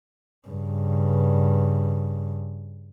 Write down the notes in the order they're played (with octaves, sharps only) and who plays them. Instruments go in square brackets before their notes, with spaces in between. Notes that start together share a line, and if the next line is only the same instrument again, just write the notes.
[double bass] G2 C#3